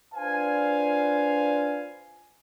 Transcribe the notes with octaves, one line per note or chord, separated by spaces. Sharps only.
D4 F4 B4 C5 F5 G#5